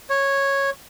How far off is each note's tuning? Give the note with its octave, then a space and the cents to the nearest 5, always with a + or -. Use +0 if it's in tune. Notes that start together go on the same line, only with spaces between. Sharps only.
C#5 -10